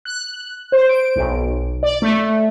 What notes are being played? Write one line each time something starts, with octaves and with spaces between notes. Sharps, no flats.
F#6
C5
D7
B1
D5
A3